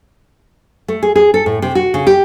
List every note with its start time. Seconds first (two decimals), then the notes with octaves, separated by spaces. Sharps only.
0.88 A3
1.03 G#4
1.16 G#4
1.34 A4
1.46 A2
1.62 C3
1.75 F#4
1.94 C#3
2.07 G4